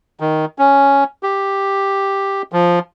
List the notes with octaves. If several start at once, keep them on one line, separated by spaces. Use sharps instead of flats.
D#3
C#4
G4
F3